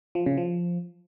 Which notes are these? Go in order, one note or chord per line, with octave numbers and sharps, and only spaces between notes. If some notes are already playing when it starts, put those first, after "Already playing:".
F3
C#3
F3